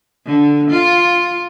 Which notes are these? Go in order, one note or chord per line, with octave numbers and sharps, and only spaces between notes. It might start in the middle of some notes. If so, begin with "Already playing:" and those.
D3
F4